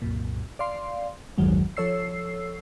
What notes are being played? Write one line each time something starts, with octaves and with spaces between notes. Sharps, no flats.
C2 F#2 A#2
D5 F5 C6
A1 E2 G2 D#3 F#3 G#3
F3 A4 C#5 E6 C7